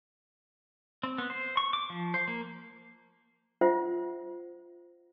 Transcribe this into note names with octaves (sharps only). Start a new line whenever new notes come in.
C4
B3
C5
C#6
D6
F3
C5
A#3
F4 C5 E5 F#5